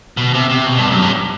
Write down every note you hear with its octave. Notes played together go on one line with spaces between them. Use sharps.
B2
C3
C3
B2
G2
F#2
G2